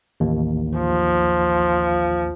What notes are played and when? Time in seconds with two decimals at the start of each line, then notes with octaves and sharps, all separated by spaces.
0.20 A1 D#2
0.78 F3